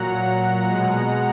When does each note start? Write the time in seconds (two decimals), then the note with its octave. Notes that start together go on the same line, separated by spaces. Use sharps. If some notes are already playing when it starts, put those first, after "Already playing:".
Already playing: A#2 F#3 F#5 A#5
0.69 B2 G#3